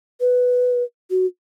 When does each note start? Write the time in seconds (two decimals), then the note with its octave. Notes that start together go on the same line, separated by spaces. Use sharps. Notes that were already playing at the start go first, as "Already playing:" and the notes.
0.20 B4
1.10 F#4